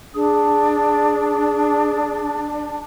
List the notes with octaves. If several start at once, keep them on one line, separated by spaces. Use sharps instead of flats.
D4 G#4